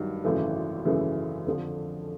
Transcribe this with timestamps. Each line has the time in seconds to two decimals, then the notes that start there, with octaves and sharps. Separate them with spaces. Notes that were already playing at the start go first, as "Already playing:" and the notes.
Already playing: G2 D#3 F#3
0.24 G#1 F#2 C#3 E3 A3
0.85 G#1 F#2 C#3 E3 A3
1.46 F2 D3 F3